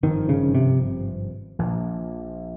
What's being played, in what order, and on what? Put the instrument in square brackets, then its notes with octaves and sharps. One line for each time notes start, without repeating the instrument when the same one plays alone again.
[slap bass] G#1 G2 F3 C4 [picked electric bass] D#3
[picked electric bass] C#3
C3
[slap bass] A#1 A#2 F3 A#3